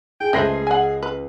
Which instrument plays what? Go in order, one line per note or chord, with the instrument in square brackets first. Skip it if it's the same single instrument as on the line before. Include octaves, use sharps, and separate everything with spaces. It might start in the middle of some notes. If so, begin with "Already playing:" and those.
[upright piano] G#4 [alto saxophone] G5
[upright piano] C#2 A#6 C7 [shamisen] A3 B4 C5 [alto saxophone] G#4
[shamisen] F#5 G#5
B4